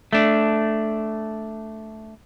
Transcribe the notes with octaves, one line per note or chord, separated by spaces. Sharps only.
A3 D4